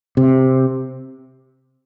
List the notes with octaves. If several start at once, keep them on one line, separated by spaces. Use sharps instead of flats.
C3